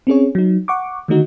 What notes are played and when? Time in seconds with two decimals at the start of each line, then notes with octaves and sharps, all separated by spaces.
0.07 C4 C#4 G#4 C#5
0.35 F#3 D#4
0.68 F#5 C#6 D6
1.08 D3 D#3 A3 D#4 F#4